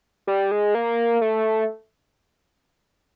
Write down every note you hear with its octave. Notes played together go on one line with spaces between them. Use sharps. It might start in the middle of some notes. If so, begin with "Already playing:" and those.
G3
G#3
A#3
A3